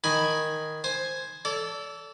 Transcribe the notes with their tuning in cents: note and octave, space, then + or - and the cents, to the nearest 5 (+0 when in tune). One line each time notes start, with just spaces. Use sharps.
D#3 +0 G#5 +0 B5 +0
C5 +0 G#5 +0
A4 +0 D5 -35